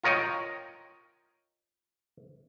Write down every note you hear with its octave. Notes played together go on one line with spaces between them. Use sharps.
F4 A#4 C#5 D#5 G5